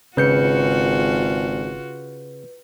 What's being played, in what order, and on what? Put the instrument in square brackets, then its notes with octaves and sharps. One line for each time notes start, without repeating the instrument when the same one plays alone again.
[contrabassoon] G#1 [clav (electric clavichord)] C#3 [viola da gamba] F4 F#4 [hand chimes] B4 G6 C#7